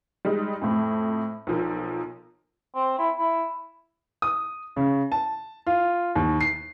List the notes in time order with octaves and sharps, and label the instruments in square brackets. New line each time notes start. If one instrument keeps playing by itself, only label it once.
[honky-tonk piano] G3 G#3 D#4
F2 A2
B1 F3 A#4
[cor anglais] C4
E4
E4
[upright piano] D#6
C#3
A5
F4
D#2
C7